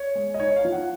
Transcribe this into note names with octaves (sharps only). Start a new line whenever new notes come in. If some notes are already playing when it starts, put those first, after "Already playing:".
Already playing: C#5
G#3
D#5
D#4 C#5
F5
F3
F#5